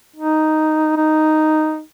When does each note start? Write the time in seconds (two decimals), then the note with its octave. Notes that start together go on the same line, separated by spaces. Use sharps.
0.16 D#4
0.97 D#4